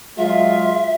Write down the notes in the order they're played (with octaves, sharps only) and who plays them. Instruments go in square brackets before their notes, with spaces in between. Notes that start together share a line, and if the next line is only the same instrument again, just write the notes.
[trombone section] F#3 G#3 F4 [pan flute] E5